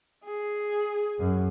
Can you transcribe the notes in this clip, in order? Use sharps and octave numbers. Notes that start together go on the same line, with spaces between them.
G#4
F#2